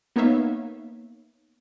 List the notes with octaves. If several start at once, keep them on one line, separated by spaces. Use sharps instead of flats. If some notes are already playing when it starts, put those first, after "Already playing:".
A#3 B3 D#4 C#5 E5 F5